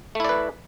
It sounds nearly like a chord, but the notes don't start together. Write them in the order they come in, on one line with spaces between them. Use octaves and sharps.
A3 E4 D5 B4